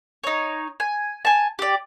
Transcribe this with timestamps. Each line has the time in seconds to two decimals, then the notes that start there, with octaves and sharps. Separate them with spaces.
0.24 D#4 C#5
0.80 G#5
1.25 G#5 A5
1.59 G4 D5